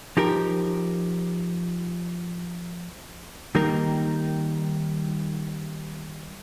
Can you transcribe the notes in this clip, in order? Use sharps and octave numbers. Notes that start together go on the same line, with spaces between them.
F3 D#4 G4 A#4
D#3 G3 A#3 D#4 A#4